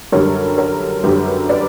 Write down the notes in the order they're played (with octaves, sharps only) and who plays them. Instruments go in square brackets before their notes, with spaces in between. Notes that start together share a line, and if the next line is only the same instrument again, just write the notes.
[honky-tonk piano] F#2 D3 G3 A#4 C#5
A#4 C#5
F#2 D3 G3 G4 B4
B4 D5